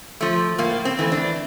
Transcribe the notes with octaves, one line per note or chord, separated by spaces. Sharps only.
F3 A3
A2 A#3
C4
E3 A3
D4